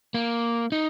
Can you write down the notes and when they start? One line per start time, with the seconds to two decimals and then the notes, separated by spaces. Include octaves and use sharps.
0.14 A#3
0.72 D#4